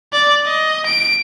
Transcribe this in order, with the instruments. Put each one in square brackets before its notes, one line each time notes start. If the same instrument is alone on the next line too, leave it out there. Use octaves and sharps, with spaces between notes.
[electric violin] D5
D#5
D7